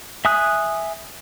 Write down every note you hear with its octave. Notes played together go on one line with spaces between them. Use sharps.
E5 G#5 D#6 F#6